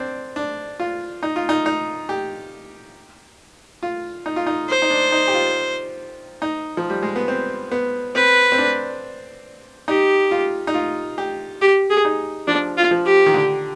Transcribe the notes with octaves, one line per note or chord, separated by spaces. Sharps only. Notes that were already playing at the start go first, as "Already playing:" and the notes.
Already playing: C4 D4
D4
F4
D#4
F4
D#4
D#4
G4
F4
D#4
F4
D#4
C5
D#4
D4
D#4
G4
F4
D#4
F3
G3
G#3
B3
C4
B3
C4 B4
C4
D4
D#4 G4
F4
D#4
F4
G4
G4
G#4
D#4
F3 D4
F4
F3
G4
D#3
D3